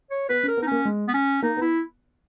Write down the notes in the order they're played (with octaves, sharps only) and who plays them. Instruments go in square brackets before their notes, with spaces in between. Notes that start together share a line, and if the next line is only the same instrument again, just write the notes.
[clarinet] C#5
[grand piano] B3 [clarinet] B4
[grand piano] C#4
[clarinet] A#4
[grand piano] B3
[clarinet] D#4
[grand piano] A#3 [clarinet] C#4
[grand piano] G#3
[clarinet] B3
C#4
[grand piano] A#3 [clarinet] D#4
[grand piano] B3
[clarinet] E4